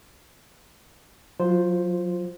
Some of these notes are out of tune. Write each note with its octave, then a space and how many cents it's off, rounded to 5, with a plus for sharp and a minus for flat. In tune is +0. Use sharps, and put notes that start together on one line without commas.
F#3 -30 F4 +0 C5 +0